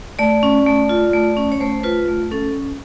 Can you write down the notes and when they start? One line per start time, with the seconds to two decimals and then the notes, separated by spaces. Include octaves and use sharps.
0.19 A3 D5
0.43 C#4
0.66 A3
0.89 F4
1.13 A3
1.37 C#4
1.52 C#5
1.60 A3 C5
1.83 F4 B4
2.08 A3
2.31 C#4 A4